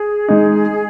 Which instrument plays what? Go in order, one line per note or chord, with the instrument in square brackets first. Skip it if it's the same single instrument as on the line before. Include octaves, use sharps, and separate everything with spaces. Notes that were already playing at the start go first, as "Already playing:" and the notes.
Already playing: [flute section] G#4
[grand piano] G#3 D#4